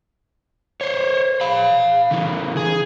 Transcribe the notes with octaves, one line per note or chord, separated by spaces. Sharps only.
C5 C#5
F5 B5
C#3 E3
G#4